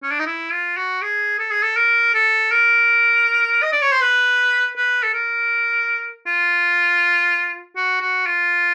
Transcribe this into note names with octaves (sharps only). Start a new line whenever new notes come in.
C#4
D4
D#4
E4
F4
F#4
G#4
A4
G#4
A4
A#4
A4
A#4
D#5
D5
C#5
C5
B4
B4
A4
A#4
F4
F#4
F#4
F4